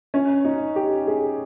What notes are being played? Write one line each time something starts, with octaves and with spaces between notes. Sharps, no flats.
C#4
D#4
G4
G#4